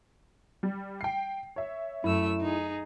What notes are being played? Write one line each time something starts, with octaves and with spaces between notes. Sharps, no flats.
G3
G5 C7
C#5 E5
F#2 A3 E4 E6
D#4 G#4